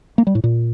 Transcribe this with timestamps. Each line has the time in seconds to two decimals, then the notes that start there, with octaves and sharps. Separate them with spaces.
0.18 A#3
0.27 G3
0.35 A2
0.44 A#2